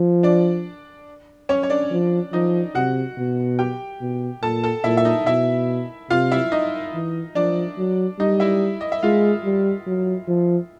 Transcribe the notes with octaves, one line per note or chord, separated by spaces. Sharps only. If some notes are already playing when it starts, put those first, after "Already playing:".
Already playing: F3
D4 D5
C#4 C#5
C#5
D4 D5
F3
F3 D#4 D#5
C3 F#4 F#5
B2
G4 G5
B2
A#2 A4 A5
A4 A5
A#2 E4 E5
E5
D#4 D#5
B2 E4 E5
C3 F4 F5
E4 E5
D#4 D#5
E3
F3 D4 D5
F#3
G3 D#4 D#5
E4 E5
D#5
E5
G#3 F4 F5
G3
F#3
F3